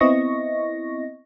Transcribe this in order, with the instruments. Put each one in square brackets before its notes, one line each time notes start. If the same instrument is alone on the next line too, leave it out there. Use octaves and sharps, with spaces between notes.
[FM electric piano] B3 C4 E4 D#5 C#6 A#6